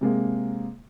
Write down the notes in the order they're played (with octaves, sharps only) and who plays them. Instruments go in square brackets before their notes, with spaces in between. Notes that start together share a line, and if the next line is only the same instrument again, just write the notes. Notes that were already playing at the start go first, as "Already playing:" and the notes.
[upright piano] C3 G#3 A#3